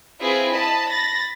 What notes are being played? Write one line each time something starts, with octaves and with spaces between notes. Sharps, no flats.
C4 E4 F4 G#4 B4
D#5 A5 B5
B5 A6 A#6